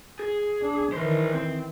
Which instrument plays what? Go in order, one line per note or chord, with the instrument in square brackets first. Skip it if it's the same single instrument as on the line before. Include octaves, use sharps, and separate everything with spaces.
[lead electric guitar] G#4
[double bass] D4
[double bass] D#3 E3 [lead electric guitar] A#4 C5
[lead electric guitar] C4